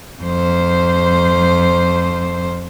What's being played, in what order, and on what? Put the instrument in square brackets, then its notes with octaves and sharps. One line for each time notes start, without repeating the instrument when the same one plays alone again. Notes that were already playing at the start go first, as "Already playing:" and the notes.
[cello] F2 C5